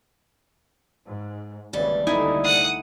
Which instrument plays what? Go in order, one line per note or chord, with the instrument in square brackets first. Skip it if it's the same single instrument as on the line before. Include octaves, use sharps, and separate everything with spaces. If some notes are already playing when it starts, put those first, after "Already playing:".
[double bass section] G#2
[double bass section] G#1 C#3 E3 [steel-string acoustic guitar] D#2 G3 A5
[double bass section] C2 D3 A3 [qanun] D#4 E4 G#5
[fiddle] F#5 D#6